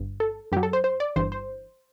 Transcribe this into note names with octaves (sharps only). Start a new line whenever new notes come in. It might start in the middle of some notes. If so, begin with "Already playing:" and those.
Already playing: G1 G2
A4
F#2 F#3 G4
A4
C5
C5
D5
G1 G2 E3 C5
C5